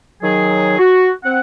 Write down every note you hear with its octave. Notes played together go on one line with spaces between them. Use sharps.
D#3 F#3 G#4
F#4
C4 F#5